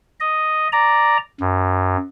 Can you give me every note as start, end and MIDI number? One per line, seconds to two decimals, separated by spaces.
0.20 0.68 75
0.72 1.18 74
0.72 1.18 82
1.40 1.97 42